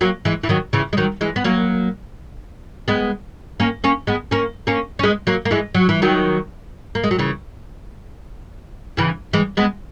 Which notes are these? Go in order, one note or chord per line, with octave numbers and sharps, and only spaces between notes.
F#3 A#3
E3 G#3
E3
D#3 F#3
C#3 E3
G#3
D#3 F#3
E3 G#3
B3
F#3 A#3
G#3 B3
A#3 C#4
A#3 C#4
G#3 B3
A#3 C#4
A#3 C#4
C#4
G#3 B3
F#3 A#3
A#3
E3 G#3
F#3
E3
D#3 F#3
A#3
G#3
F#3
C#3 E3
C#3 E3
E3 G#3
G#3 B3